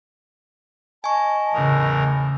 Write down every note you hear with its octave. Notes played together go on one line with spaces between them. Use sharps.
D#5 G#5 A5 C#6
E2 A2 C#3 A#4 D#6